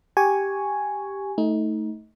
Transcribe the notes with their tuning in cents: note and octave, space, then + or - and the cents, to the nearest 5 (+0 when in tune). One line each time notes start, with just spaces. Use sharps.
G4 +0 G#5 +0 C#6 +0
A3 +0 D#4 +25